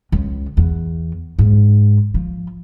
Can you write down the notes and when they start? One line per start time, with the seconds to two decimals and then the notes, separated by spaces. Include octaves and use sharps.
0.12 C#2
0.57 E2
1.39 G#2
2.14 F3